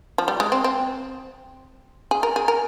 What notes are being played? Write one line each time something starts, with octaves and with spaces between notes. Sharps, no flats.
F3
G3
G#3
C4
C4
G#4
A#4
G#4
A#4